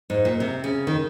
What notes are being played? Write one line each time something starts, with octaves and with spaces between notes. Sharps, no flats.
G#2
A#2
C3
C#3
D#3